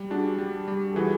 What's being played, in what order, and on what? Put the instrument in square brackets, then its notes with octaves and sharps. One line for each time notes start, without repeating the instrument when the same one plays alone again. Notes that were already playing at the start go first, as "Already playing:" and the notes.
Already playing: [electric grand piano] G3
[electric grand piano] D4 [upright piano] F#4 G#4
[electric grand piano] G3
G3
[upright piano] A4
[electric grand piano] E3 [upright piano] F#4 G#4